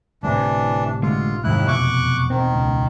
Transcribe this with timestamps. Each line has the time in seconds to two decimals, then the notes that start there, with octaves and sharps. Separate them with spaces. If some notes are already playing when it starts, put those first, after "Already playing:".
0.23 G1 A2 C3 E3 D4
1.03 D3 G#3 A3 F4
1.44 F1 D#2 G#2 D#3 E4 F#6
1.68 E2 B2 C#6 D6 F#6
2.30 D#3 C4
2.53 C#2